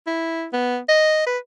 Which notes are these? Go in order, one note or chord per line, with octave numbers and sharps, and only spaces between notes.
E4
B3
D#5
B4